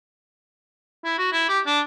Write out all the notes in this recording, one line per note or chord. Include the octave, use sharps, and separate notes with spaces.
E4
F#4
E4
G4
D4